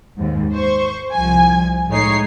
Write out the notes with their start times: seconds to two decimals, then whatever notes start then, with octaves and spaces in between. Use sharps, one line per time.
0.17 D#2 G#2
0.52 C5 C#6
1.13 C2 F3 G#5
1.89 A2 G#3 D#4 C#5 C7